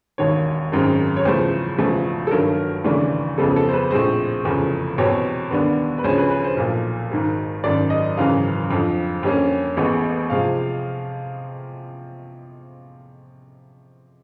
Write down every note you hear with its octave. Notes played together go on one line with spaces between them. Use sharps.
E1 D#2 D#3 C#5
G#1 F#2 D#3 G#3 C4
C#5
E2 C#3 F3 A3 C5
E1 E2 C#3 F3 A3
A4
G1 G2 D#3 F#3 A#4
D#2 C#3 E3 A3 D4
F2 C#3 F3 G#3 B3 A4
A4
C5
B4
A#1 A2 F3 G#3 C4 C5
F1 E2 C#3 F3
E2 B2 G3 C4 C#5
D#2 D3 G3 B3 D4
B4
D2 C#3 F3 G#3 C#4 C5
B4
B4
C5
B1 A#2 F3
G#1 G#2 D#3
G#1 F#2 D#3 D5
D#5
G#1 F#2 C#3 E3 F5
F2 D3 F3
F2 D3 G3 A#3 C#4
A1 A2 E3 G#3 B3
C3 F3 G#3 F5